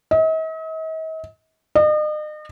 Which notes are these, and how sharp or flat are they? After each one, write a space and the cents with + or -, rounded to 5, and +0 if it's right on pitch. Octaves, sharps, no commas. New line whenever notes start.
D#5 +45
D#5 -40